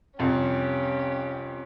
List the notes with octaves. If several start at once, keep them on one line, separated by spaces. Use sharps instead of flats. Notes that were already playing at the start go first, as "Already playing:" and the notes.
C2 F2 C#4 G4